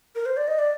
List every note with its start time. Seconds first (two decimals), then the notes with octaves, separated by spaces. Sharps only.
0.15 A#4
0.26 C5
0.37 D5
0.48 D#5
0.59 D5